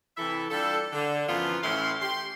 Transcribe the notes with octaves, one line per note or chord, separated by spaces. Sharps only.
C3 E3 E4 A4 E5
G3 D4 F4 A4
D3
F#2 E3 F3 B3 F4
A2 E3 C#4 E4 F5 C6
G4 C6